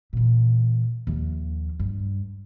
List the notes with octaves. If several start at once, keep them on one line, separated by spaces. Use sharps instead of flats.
A#2 E3
D#2 F3
G2